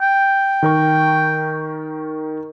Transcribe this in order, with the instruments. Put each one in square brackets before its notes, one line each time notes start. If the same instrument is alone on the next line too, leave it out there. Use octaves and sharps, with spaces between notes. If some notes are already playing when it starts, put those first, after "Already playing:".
[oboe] G5
[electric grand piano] D#3 A#4 C#6